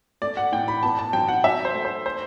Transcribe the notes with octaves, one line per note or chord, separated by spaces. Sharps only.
A3 D5
F#5
A2 G5
B5
B3 A5
A5
F#3 G5
F#5
F#3 E5
C5
A3
C5
C5